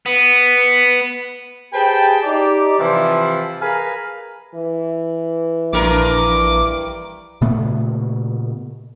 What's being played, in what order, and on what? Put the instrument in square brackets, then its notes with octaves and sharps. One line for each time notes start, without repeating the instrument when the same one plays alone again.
[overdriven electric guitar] B3
[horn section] G4 G#4 B4 C5 G5 A5
D#4 G4 D5
C3 E3 F3
G#4 A#4 B4 F5 G#5 A#5
[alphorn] E3
[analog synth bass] A#1 [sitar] G2 A#4 [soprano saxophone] D6
[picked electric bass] A#2 C#3 A3 B3